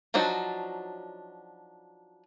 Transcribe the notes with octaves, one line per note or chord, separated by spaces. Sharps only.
F3 F#3 D4 D#4 F#4